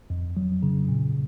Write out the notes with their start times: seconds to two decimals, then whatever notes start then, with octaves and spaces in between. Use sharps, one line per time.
0.10 F2
0.37 F#3
0.63 C#3
0.89 A#2